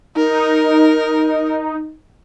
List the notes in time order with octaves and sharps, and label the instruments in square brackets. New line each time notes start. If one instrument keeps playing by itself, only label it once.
[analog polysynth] D#4 [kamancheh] A#4